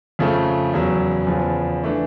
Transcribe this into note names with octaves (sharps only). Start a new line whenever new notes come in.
F2 C#3 F3 A3
E2 C#3 F#3
E2 C#3 F3
E3 A3 D4